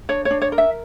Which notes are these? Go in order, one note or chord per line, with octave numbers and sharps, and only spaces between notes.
D4 C#5
C#5
D4
C#5
A#4
E5